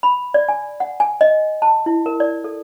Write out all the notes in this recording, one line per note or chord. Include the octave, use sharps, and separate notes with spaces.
B5
D5
G#5
F#5
G#5
D#5
A5
E4
A#4
D5
A4